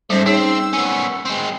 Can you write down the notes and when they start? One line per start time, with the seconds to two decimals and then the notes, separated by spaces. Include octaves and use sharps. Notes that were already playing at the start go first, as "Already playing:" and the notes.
0.10 G#2 G3 A3 C#4 C5
0.26 C4 D#4 G#4 C#5 E6
0.73 B3 C#4
1.25 G#3 C4